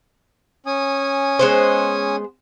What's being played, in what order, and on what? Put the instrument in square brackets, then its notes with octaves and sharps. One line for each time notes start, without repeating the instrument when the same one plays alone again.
[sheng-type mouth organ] C#4 G#5 D#6
[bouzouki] G#3 B3 C5